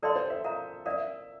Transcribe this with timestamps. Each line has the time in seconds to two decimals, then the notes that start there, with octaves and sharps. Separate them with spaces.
0.03 A4 A#4 D5 F5 C6
0.16 C5
0.30 E5
0.44 A#4 F5 A#5
0.86 A#4 D5 E5 F5